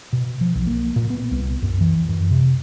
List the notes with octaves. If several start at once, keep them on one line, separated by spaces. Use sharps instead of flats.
B2
F3
B1
A#3
A#2
B3
C2
F#2
E3
F#2
C3